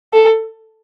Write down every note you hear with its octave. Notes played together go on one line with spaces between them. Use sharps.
A4